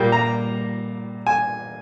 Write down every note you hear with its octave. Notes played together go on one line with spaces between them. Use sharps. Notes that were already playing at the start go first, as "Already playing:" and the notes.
Already playing: A#2 G3 A#3 G5
A#5
G#5